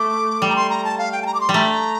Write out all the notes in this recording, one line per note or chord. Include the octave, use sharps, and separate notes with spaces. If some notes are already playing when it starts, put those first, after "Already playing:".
Already playing: A3 D6
G3
A#5
C6
A#5
A5
F5
G5
A5
A#5
D6
C6
G3
A3 A#5